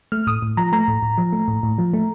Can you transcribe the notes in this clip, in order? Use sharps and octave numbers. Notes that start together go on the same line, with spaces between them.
A3 F6
A2 D#6
A2
F3 A#5
A3 A#5
A2
A2
F3
A3
A2
A2
F3
A3